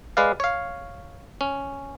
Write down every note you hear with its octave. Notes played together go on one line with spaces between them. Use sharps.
G#3 B4 D5 F5
C#5 F5
C#4